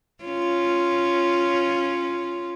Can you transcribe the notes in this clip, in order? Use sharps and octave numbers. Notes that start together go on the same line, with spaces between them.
C#4 F4